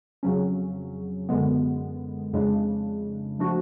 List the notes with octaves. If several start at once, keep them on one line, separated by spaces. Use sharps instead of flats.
F2 C#3 F#3 C#4
F#2 D3 G#3 B3
F2 C#3 G#3 D4
F3 A3 D4 F#4